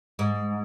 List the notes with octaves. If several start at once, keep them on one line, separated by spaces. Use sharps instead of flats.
G#2